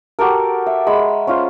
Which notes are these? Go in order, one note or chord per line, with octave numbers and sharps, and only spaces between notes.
F#4 G4 A4 A#4
E5
G#3 B5
C#4 F4 C5